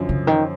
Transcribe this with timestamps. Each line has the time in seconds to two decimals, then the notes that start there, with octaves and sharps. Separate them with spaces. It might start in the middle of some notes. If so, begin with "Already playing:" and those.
Already playing: F#2 D3 F3
0.09 C#3
0.27 D#3